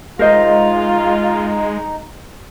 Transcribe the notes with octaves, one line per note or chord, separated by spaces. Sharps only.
G#3 D#4 F4 A#4 C5 D#5